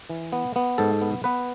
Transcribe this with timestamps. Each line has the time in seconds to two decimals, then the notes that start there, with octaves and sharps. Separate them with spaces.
0.10 E3
0.32 B3
0.56 B3
0.78 G#2 A4
1.01 B3
1.24 B3 B4